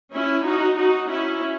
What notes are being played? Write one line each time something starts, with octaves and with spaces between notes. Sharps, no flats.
C#4 E4
D#4 F#4
D#4 F#4
C#4 E4